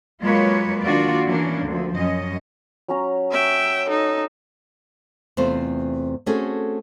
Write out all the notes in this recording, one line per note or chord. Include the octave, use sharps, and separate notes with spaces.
F#3 G#3 A#3 F4 B4 C#5
D#3 A#3 D4 F4 F#4 D5
E3 A#3 C#4 D4
D2 F3
F#2 C#4 D#5
F#3 C#4 A#5
E5 G5
D#4 A4
E2 C3 A3 C4 F4 C5
A3 C4 C#4 F#4 G#4 A4